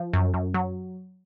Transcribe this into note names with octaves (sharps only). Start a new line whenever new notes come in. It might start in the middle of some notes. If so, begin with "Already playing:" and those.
Already playing: F3
F#2
F#2
F#3